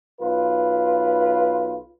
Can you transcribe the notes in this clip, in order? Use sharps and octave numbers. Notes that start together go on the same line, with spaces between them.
B1 F4 B4